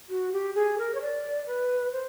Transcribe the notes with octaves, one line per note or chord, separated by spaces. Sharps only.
F#4
G4
G#4
A#4
C#5
D5
B4
C5